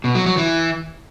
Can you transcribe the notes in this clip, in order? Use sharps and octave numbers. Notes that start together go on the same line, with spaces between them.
B2
F#3
F#3
E3